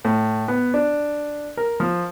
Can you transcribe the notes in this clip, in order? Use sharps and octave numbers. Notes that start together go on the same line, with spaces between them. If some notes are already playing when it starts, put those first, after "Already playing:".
A2
B3
D4
A#4
F3